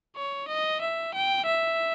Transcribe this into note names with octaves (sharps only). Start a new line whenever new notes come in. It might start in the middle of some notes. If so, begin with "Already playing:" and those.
C#5
D#5
E5
G5
E5